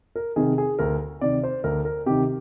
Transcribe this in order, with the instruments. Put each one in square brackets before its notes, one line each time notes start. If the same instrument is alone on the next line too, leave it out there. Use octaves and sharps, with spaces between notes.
[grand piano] A#4
C3 D#3 G#4
G#4
D2 A#4
C3 D#3 D5
C5
D2 A#4
A#4
C3 D#3 G4